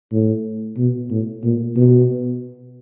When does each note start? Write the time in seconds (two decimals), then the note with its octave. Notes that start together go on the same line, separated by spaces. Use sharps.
0.12 A2
0.78 B2
1.10 A2
1.44 A#2
1.76 B2